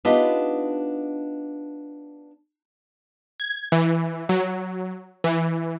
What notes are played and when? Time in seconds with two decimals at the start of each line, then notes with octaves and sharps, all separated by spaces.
0.05 B3 D4 D#4 F4 G4 D#5
3.40 G#6
3.72 E3
4.29 F#3
5.24 E3